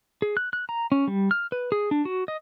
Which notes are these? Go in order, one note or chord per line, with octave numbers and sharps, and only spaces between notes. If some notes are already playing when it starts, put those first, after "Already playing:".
G#4
F#6
F#6
A#5
C#4
G3
F6
B4
G#4
D4
F#4
D#5